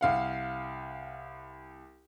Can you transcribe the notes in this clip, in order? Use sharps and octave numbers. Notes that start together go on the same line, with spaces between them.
C2 F5 F#5